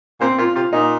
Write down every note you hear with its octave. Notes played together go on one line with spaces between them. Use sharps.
A#2 C4
A#2 F4
C3 F4
A#2 D#4